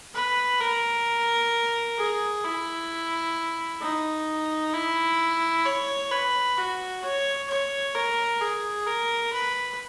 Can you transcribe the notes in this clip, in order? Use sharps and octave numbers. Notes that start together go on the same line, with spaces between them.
B4
A#4
G#4
E4
D#4
E4
C#5
B4
F#4
C#5
C#5
A#4
G#4
A#4
B4